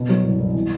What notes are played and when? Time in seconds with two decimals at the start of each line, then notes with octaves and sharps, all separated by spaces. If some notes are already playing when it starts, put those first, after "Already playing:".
Already playing: B2
0.09 F#3
0.24 C2
0.39 C2
0.54 E3